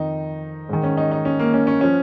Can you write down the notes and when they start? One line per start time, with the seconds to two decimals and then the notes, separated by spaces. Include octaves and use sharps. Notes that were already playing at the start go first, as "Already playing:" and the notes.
Already playing: F2 D#3 D#4
0.69 G#2 D#3
0.83 C#4
0.97 D#4
1.12 D#4
1.25 C#4
1.39 A#3
1.54 C#4
1.67 C#4
1.81 F3 C#4